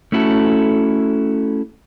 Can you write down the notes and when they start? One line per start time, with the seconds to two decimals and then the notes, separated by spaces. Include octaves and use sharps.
0.12 A3 C#4 E4 F#4 A4